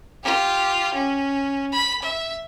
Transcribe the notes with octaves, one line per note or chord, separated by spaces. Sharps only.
F4 G4
C#4
B5 B6
E5